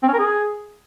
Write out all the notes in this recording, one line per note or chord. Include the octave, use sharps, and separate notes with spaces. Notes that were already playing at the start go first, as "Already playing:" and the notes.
C4
C#4
A#4
G#4